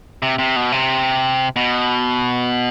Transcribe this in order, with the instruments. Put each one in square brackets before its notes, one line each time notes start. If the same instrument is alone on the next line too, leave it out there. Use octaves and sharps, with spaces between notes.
[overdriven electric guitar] C3
C3
B2
C3
B2